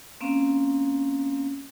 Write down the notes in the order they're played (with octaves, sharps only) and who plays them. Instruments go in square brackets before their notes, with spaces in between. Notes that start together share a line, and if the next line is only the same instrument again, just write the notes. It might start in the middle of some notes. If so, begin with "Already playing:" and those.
[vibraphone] A#3 C4 C#4 F5